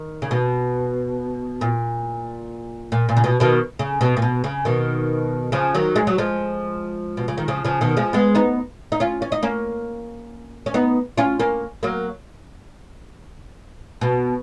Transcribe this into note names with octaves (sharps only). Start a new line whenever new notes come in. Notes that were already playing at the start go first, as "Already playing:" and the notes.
Already playing: D#3
C#3
B2
A#2
A#2
A#2
C#3
B2
B2 D#3
C#3
B2
A#2
B2
C#3
B2 D#3
C#3 F3
D#3 F#3
G#3
F#3
F3 G#3
B2
C#3
D#3
C#3 F3
C#3 F3
B2 D#3
F3 G#3
G#3 B3
B3 D#4
D#4
C#4 F4
C#4
D#4
A#3 C#4
C#4
B3 D#4
C#4 F4
A#3 C#4
F#3 A#3
B2